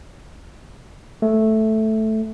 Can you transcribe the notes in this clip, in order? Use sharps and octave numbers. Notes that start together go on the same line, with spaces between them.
A3